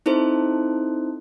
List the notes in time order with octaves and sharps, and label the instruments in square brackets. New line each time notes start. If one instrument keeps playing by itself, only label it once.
[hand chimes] C4 D#4 E4 A4 C5